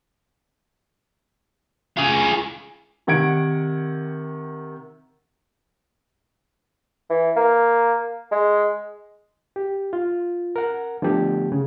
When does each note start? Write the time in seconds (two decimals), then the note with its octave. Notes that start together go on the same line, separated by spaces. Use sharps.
1.97 F4 G#4
3.07 C3 D#3 F#5 G#6 D7
7.10 E3
7.36 A#3
8.32 G#3
9.56 G4
9.93 F4
10.56 A#4 F#5
11.02 D3 F3 A3 B3 G4
11.52 C#3